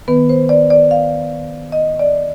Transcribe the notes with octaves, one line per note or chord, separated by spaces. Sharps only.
D#3 B3 B4
C5
D5
D5
F5
D#5
D5